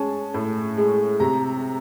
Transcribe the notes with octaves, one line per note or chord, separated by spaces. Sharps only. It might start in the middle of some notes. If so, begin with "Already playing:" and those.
Already playing: G#3 C#4 A5
A2
G#3
C3 A#5